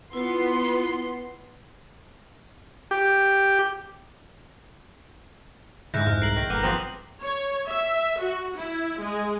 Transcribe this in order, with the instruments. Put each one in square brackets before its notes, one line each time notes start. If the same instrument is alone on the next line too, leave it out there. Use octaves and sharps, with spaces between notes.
[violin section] B3 C6 [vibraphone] E4 F4
[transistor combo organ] G4
[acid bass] G#2 [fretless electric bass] C#3 E3 G#3 [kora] E4 [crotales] F#6 G6 A#6
[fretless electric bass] F2 A2 [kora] G#3 [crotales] F6
[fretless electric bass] C2 [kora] A#4 [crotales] C7 F#7
[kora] D#3
[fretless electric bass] G1 [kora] B3 A#4 [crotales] D6 F6 D#7
[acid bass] F3 [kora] C4 B4 [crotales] D#6
[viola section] C#5
E5
F#4
E4
G#3